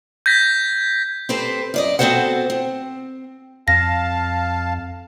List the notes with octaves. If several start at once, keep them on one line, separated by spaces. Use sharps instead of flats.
G6 G#6 A#6 B6
C4 G4 A4 B4 C5
F#2 D5 D#5
B3 C4 F#4 A4 C5 F#5
C4
F2 F5 A5 A#6